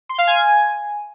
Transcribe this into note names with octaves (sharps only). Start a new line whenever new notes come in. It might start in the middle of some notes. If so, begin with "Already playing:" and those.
C6
F5
G#5